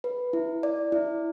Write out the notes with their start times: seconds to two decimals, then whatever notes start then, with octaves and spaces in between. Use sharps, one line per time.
0.04 B4
0.33 E4
0.63 D5
0.92 E4